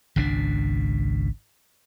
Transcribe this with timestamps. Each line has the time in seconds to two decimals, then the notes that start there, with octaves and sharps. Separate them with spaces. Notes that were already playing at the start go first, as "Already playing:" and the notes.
0.16 G#1 C#2 B2 D4